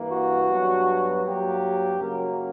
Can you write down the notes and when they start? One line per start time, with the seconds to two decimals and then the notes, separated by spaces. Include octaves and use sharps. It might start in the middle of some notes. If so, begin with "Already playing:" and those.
Already playing: G2 E3 A#3
0.10 F#4
0.48 G2 F#3 B3
1.24 G2 F#3 A#3 G4
1.99 F#2 C#3 F#3 A#3 A#4